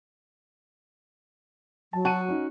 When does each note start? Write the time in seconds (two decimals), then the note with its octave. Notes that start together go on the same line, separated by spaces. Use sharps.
1.93 F#3 A5
2.05 F#4 A5 D#7
2.29 C#4 D#4